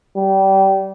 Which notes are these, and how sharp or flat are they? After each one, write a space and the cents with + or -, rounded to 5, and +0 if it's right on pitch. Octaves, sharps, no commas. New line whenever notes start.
G3 -25